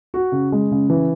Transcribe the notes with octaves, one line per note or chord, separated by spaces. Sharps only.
F#4
C#3
G#3
C#3
E3